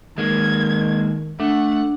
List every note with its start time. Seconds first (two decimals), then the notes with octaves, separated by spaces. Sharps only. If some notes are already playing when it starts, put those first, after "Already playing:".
0.18 D#3 G#3 A#3 G#6
1.40 A3 D4 F#5